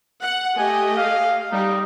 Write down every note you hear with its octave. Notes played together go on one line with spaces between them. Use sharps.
F#5
A3 G4 D#5 G#5
F5
G3 D#4